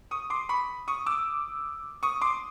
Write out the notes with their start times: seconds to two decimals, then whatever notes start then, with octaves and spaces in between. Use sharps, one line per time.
0.11 C#6 D#6
0.30 C6 D6
0.49 B5 C#6
0.88 C#6 D#6
1.06 D6 E6
2.03 C#6 D#6
2.21 C6 D6